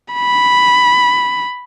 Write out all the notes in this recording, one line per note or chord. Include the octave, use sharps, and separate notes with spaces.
B5